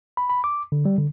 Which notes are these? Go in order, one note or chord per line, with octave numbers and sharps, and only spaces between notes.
B5
B5
D6
D3
G3
D3